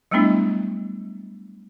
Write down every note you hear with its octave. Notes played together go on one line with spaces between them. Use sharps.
F#3 G3 A3 B3 D4 E4